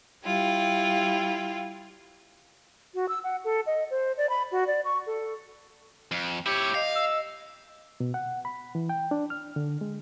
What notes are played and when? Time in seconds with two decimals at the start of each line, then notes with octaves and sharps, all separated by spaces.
0.24 G3 E4 F4 G5
2.95 F#4
3.09 E6
3.24 F#5
3.44 A4
3.67 D#5
3.91 C5
4.18 D5
4.29 B5
4.52 F#4
4.68 D5
4.85 C#6
5.07 A4
6.11 F2
6.46 E4 G4 C#5
6.74 D#5 F5
6.96 E6
8.00 B2
8.14 F#5
8.45 B5
8.75 E3
8.89 G5
9.11 D4
9.30 F6
9.56 D3
9.81 G#3